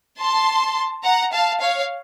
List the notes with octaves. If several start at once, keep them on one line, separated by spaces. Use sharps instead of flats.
A5 C6
F#5 A#5
F5 A5
C#5 F5